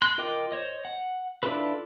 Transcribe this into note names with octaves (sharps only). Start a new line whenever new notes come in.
C6 F#6
F4 A#4 D#5 G5 D6
C5 C#5 D#5
F#5
D4 E4 F4 A4 B4